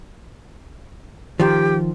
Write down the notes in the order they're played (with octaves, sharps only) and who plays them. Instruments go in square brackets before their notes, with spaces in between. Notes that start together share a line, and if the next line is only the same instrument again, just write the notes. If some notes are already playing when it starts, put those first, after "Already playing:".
[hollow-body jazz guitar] D#3 F3 [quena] G4